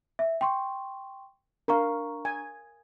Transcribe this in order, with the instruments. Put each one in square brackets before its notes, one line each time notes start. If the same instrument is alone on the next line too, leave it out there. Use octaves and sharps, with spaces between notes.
[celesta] E5
G5 C6 C#6
[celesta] D4 A#5 C#6 [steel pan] A#4 F5
[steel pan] G#5